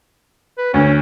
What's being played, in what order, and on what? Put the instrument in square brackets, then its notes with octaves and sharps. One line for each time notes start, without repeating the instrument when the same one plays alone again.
[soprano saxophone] B4
[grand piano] D2 [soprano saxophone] C#4